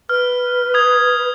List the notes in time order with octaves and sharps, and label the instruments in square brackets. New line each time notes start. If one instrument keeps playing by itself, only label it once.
[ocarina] B4 [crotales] F6
[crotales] D#6 G#6